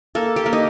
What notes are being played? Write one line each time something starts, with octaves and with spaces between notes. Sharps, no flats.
A#3 A4
G4
A#3
D#4